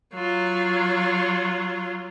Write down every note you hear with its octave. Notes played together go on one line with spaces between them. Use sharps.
F#3 F4